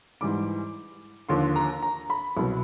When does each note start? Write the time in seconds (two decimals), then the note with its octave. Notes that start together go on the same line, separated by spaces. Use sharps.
0.21 G#2 E3 G3 D6
1.29 D#2 D3 F3 C6
1.56 A#5
1.82 A#5
2.10 B5
2.37 C2 B2 F#3